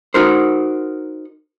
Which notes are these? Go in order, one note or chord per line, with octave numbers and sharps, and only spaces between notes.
D#4 F#4 A#4 C5